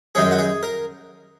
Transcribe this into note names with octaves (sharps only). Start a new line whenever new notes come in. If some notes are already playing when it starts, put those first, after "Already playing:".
F#2 D#3 G#3 C#4 G#4
F#4
G#4
A#4